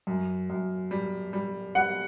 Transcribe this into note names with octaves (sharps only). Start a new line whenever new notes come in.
F#2
F#2
G3
G3
G3 F#5